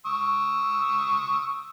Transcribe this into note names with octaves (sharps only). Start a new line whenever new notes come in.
C#6 D#6 E6